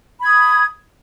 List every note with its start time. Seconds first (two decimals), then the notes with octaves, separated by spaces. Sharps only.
0.20 B5
0.23 G#6
0.27 D#6